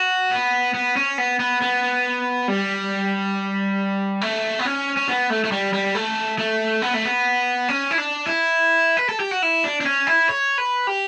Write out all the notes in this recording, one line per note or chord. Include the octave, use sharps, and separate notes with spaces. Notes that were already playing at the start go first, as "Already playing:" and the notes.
Already playing: F#4
B3
B3
C#4
B3
B3
B3
G3
A3
B3
C#4
C#4
B3
A3
A3
G3
G3
A3
A3
B3
A3
B3
C#4
E4
D4
E4
B4
A4
G4
F#4
E4
D4
D4
C#4
E4
C#5
B4
G4